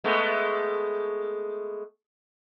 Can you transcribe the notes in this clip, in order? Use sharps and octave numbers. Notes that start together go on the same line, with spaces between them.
G#3 A3 B3